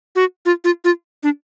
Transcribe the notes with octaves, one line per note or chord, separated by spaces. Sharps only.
F#4
F4
F4
F4
D4